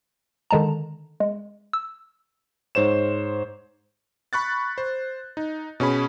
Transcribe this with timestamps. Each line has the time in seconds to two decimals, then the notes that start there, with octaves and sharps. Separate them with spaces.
0.51 D3 D#3 G#3 A5 A#5
1.20 G#3
1.73 E6
2.75 G#2 C5 C#5 E7
4.33 B5 C#6 F#6 A6
4.78 C5
5.37 D#4
5.80 B2 C#4 G#4 B5